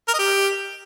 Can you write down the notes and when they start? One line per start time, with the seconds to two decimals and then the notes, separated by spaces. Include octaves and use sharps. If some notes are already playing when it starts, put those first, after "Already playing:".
0.08 A#4
0.13 D#5
0.19 G4